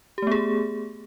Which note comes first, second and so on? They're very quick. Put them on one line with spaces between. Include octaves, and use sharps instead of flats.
G4 A3 B3 G#4